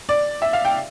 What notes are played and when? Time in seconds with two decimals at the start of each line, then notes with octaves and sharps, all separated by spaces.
0.09 D5
0.42 E5
0.53 F5
0.65 G5